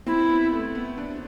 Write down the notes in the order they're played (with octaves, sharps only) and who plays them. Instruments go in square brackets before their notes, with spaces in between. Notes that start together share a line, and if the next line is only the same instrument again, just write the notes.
[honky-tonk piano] C4 [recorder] E4
[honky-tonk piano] B3
A3
B3
D4